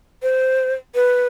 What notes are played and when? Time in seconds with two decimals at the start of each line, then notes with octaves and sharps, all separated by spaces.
0.23 C5
0.95 B4